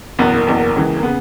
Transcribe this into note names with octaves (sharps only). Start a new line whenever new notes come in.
F#1 E2 B2 B3
A#3
F#1 E2 B2
C#2 C#3 E3
A#3
C#3 B3